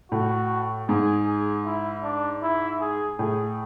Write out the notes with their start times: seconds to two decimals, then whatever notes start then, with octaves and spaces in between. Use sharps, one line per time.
0.11 A2 F#4
0.89 G#2 G#4
1.27 G#4
1.66 E4
2.03 D4
2.43 E4
2.81 G#4
3.19 A2 G#4